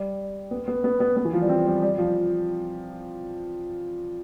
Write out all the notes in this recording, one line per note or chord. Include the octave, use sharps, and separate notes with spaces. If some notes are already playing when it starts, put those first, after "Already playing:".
Already playing: G3
B3
B3
B3
B3
B3
E3
F3
G3
C4
G3
G3
F3